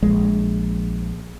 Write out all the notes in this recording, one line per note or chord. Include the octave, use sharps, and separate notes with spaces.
A#1 G#3